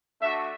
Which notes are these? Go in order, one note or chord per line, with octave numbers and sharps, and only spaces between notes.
A3 D4 F#4 E5